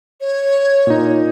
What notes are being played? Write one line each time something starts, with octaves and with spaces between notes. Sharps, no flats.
C#5
A#2 D#4